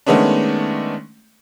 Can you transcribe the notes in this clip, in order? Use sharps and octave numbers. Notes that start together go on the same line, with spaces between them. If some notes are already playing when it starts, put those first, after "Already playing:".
D#3 G#3 A3 B3 C#4 D4